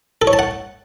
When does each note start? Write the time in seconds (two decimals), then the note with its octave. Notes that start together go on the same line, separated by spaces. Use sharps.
0.22 A4
0.27 C#5
0.33 A5
0.39 F#5